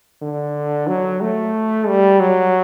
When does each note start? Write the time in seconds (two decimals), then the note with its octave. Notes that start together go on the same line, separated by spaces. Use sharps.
0.22 D3
0.88 F#3
1.21 A3
1.87 G3
2.20 F#3